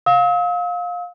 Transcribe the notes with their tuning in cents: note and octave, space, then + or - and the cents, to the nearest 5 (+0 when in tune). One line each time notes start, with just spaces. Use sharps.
F5 +20 E6 -45